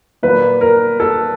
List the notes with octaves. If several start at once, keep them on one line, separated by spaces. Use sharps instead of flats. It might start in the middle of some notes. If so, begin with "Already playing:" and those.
A#2 F#3 A#3 B4
A#4
A4